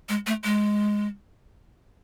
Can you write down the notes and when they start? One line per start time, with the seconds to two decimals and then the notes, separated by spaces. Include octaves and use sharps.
0.09 G#3
0.27 A3
0.44 G#3